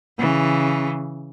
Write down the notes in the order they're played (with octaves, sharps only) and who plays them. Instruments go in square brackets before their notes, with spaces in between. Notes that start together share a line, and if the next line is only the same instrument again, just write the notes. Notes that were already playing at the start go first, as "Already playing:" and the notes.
[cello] C#3 E3